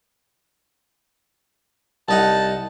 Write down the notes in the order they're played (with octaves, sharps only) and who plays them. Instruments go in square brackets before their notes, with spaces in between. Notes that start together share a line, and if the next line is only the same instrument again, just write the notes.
[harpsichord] C2 D#4 F#5 [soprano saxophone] A5